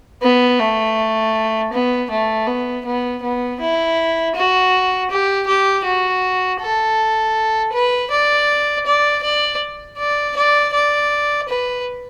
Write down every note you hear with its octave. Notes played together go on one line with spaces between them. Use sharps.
B3
A3
B3
A3
B3
B3
B3
E4
F#4
G4
G4
F#4
A4
B4
D5
D5
D5
D5
D5
D5
B4